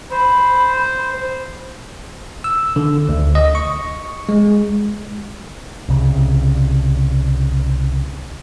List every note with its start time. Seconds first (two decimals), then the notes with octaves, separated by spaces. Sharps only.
0.11 C5 B5
2.44 E6
2.76 D3
3.09 D2
3.35 D#5
3.55 C#6
4.29 G#3
5.89 C2 C#3